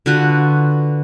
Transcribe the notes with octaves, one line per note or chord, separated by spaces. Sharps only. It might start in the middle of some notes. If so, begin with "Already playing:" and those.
D3 F4 F#4 B4